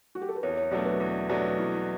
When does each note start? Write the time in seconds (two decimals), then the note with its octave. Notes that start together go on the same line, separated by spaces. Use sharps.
0.15 F#4
0.22 G4
0.29 A4
0.36 B4
0.43 E2 C#5
0.57 C#5
0.71 B2 F#3 A3 D4 D5
0.85 B4
1.00 E2
1.29 B2 F#3 A3 D4
1.58 E2 E4